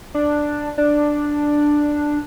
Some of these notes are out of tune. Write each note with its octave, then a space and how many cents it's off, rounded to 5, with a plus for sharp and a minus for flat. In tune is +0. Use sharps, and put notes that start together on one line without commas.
D4 +5
D4 +5